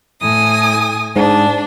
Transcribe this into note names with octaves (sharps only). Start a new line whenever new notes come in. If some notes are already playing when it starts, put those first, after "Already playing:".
A2 G#5 D#6
G#2 D4